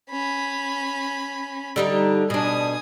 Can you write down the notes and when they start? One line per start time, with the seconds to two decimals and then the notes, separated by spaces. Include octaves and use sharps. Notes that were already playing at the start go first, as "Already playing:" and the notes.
0.11 C#4 B5
1.76 D3 G3 D#4
2.30 B2 D4 G#5 D#6